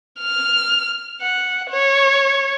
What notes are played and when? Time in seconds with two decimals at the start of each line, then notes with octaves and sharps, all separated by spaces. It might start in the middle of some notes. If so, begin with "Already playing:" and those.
0.19 F6
1.22 F#5
1.70 C#5